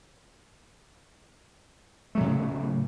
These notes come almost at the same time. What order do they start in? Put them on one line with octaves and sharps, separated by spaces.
A3 F#3 A2 C#3